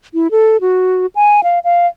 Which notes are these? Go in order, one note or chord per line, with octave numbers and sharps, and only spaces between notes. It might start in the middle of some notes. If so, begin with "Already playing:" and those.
E4
A4
F#4
G#5
F5
F5